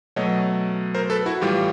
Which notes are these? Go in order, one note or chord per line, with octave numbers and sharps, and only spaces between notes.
B2 F#3 A3 C#5 D#5
A#4 C5
A4 B4
E4 F#4
A2 E3 G3 F4 G4